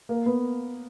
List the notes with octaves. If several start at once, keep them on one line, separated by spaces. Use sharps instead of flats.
A#3
B3